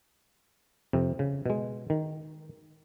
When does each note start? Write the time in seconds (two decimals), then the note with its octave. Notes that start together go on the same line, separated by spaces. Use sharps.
0.93 F2 C3
1.19 C#3
1.46 B2 G#3
1.90 D#3